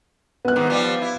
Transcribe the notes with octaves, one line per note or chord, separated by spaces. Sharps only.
B3 F#6
G#2 D#3
F3 G3 F4
E4